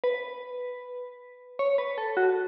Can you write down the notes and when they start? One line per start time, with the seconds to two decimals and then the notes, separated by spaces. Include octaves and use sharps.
0.04 B4
1.59 C#5
1.78 B4
1.98 A4
2.17 F#4